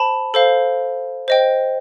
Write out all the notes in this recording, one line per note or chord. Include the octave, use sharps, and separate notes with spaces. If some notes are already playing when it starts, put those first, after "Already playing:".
Already playing: C5 A5 B5
A4 C5 F5
C5 D#5 G5